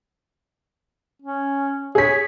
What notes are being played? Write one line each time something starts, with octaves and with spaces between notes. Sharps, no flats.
C#4
G#4 C#5 B6